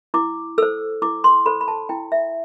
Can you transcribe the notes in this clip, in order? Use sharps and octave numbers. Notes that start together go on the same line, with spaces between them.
E4 D6
A4 C5 E6
E4 D6
C6
A4 C5 B5
B5
A5
E4 G5
E5